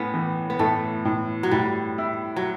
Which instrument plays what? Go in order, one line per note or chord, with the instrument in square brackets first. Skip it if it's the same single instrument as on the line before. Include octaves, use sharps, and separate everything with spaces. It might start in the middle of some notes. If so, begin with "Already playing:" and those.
Already playing: [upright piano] A2 [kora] B3 C#4
[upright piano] E3
[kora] B3
[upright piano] A2 [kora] A3
[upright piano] A2
[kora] F#3
[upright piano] A2 [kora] G3
[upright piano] E4
[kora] F#3